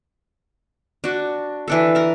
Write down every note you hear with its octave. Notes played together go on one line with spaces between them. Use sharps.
D4 F#4
E3 D4 A4
A#4 A5